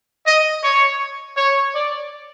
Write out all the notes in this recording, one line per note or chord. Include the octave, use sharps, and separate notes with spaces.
D#5
C#5
C#5
D5